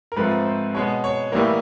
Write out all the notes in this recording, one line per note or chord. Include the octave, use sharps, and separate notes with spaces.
A#4
G#2 F3 A3 C4 B4
C5
B2 G#3 B3 C#5
C#5
A2 E3 G3 A#3